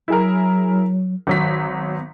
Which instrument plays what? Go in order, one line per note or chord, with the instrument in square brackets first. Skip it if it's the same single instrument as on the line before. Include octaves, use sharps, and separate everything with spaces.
[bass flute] F#3 [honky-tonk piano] E4 G#4 A#4
[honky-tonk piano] G#1 F#3 B6 [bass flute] D#3
[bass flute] B3